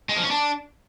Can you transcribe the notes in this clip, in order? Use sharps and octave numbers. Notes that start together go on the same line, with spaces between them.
G#3
F3
C#4
D4